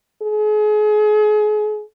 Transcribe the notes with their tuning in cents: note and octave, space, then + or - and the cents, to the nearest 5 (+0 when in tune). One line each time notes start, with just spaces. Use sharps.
G#4 +35